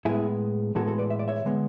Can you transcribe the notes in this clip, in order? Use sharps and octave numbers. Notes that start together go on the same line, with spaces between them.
A2 G#3 B3 E4 G#4
A2 E3 G#3 B3 F#4 A4
F#4 A4
B4 D5
E5
D5
C#5 E5
D3 G#3 B3